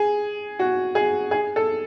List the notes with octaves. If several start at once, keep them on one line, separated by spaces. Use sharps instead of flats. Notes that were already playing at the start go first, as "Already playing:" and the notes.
Already playing: G#4
F#4
G#4
G#4
A4